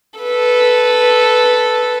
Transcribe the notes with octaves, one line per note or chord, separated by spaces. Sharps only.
A4 B4